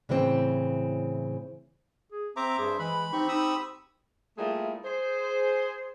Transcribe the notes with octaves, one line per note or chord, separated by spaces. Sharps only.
A2 C#3 E3 C4
G#4
C4 C5 E5 A#5 D6
G2 G#4
E3 G#3 B4 B5
C4 D#4 G4 C#6
D#4 B5 D#6 E6
G3 A3 A#3 E4 F4 G#4
G#4 C5